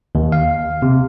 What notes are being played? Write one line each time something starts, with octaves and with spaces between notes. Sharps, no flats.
D#2
F5
C3